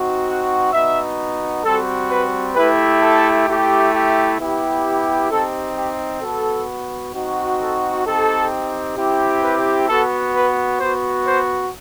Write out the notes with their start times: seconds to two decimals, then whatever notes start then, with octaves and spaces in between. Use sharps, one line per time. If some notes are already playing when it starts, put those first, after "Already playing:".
Already playing: C4 D#4 F#4
0.27 F#5
0.73 B3 D#4 F#4 E5
1.64 G3 C4 F#4 A4
2.10 B4
2.55 A3 E4 G4 B4
3.02 A4
3.47 A3 E4 G4
3.93 G4
4.39 B3 E4 G4
5.31 C4 D#4 G4 A4
5.76 G4
6.22 B3 F#4 A4
7.14 C4 D#4 F#4
7.60 A4
8.05 C4 D#4 G4 A4
8.97 C4 E4 G4
9.42 B4
9.88 B3 F#4 A4
10.34 B4
10.80 B3 F#4 C5
11.26 C5